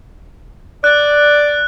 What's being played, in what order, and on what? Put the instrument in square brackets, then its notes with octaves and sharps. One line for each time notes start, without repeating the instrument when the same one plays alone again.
[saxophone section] D5 [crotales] F#6